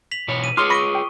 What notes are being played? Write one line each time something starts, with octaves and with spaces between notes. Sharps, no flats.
B6 F7 F#7
B2 E3 C#5
D#7
F4 G#4 C#5 C6 D6 D#6 F6 G7
B5 C#6 A#6 B6 D7 G7
G5